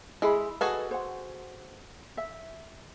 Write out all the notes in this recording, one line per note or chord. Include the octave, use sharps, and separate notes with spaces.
G#3 E4 G#4 B5
F#4 G#4 A4 B4 D#5
C5 F#5
E5